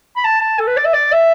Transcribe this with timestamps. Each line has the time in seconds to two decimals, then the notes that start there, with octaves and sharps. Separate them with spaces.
0.16 B5
0.24 A5
0.41 A5
0.59 A4
0.68 B4
0.77 D5
0.85 E5
0.94 D5
1.12 E5